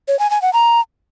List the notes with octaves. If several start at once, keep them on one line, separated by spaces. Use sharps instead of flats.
C#5
G#5
G#5
F#5
A#5